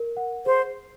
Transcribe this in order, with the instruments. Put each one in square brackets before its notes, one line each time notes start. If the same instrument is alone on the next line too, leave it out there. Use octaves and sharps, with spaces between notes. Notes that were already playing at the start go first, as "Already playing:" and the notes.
Already playing: [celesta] A#4
F#5
[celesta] G#4 [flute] C5